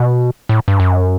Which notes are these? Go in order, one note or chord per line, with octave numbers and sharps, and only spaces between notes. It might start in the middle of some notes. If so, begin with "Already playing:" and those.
Already playing: B2
A2
G2
F#2